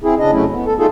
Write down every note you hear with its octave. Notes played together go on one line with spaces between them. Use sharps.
C4 E4 G#4
C#3 D4 D#5
F2 C#3 F#3 A3 C#4 E4
B3
A4
A3 D#4 F4 G#4 A4